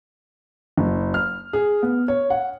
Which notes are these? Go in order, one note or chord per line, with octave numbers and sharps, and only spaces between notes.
F#1
F6
G#4
B3
C#5
F#5